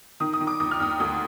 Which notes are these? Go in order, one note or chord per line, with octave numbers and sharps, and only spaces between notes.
D#3 D#6
D#6
D#3
D6
D#2 D#6
F6
D#2 D#6
D2 D#6